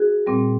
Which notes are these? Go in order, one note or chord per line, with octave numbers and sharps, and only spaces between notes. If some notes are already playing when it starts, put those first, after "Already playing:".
Already playing: F#4 G#4
A#2 G3 C4